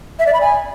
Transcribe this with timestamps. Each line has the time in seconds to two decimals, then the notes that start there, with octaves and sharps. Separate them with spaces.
0.19 E5
0.26 D5
0.34 B5
0.41 G#5